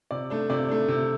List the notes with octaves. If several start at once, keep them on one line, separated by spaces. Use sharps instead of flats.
C3 D5
A3 D4
C3 D5
A3 D4
C3